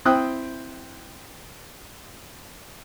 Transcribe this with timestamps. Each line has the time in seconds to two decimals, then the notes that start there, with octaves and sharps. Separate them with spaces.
0.05 C4 E4 G5 D#6 F#6